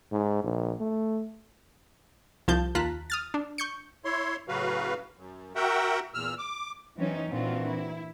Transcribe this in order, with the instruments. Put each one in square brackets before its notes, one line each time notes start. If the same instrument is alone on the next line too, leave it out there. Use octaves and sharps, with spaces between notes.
[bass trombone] G#2
A#1
A3
[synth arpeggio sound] C2 F3 A5 G6
D#2 F4 A5 A#5 F#6 B6
D#6 F6 A6
D4
C#6 G6 C#7
[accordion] E4 C#5 C6
A2 C#3 F#3 F#4 B4 F5
F#2
F#4 A#4 E5 F#5 G5
E2 A#2 E6 F6
D6
[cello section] E3 F#3 C4 C#4 D#4
A#2 E3 C4 D4 F4 F#4
E4